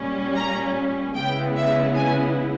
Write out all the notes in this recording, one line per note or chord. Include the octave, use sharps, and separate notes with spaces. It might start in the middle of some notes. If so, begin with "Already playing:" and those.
Already playing: A#2 G3 C#4
A#5
C#3 E3 G#3 B3 E4 G5
E5
G#5